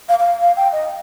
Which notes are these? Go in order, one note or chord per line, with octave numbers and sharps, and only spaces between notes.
F5
F5
F5
G5
D#5